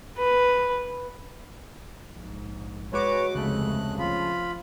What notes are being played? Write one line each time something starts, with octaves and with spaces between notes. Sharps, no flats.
B4
A#1 G#2
G#3 F#4 B4 C#5 D6
F1 D2 C#3 G#3 A3 F#6
F3 F4 B5